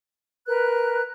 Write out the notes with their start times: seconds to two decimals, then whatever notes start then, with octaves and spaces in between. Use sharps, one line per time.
0.46 A#4 B4 F#6